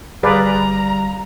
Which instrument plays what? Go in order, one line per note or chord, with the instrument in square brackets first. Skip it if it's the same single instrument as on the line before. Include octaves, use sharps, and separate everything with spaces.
[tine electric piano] G1 G3 F5 [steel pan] G#4 B4 D5 [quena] A#5